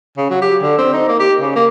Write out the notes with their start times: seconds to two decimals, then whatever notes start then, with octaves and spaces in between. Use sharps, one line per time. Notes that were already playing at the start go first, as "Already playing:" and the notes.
0.17 C#3
0.30 F#3
0.41 G4
0.62 D3
0.78 C4
0.93 D#4
1.08 A#3
1.19 G4
1.40 C#3
1.55 A#3